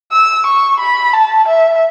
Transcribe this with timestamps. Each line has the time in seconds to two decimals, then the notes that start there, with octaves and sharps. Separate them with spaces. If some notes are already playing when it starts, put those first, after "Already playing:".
0.12 E6
0.46 C#6
0.80 B5
1.13 A5
1.48 E5